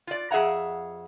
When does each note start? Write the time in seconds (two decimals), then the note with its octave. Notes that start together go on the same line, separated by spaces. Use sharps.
0.07 F4 D5
0.31 F2 G#4 E5 F#5 A#5